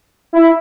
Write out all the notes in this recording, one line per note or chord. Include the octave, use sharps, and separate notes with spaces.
E4